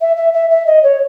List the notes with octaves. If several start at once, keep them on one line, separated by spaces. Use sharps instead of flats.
E5
E5
E5
E5
D#5
C#5